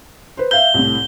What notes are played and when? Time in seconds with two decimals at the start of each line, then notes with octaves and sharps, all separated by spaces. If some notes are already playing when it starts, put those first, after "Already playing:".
0.37 B4 C5
0.51 E5 F5 G6 G7
0.74 C2 A2